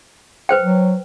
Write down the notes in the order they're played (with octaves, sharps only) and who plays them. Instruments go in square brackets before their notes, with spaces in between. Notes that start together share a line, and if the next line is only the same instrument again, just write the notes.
[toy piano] B4 C5 G5
[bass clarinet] F#3